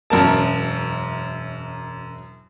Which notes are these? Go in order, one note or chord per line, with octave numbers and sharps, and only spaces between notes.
E1 F#2 A#4 A5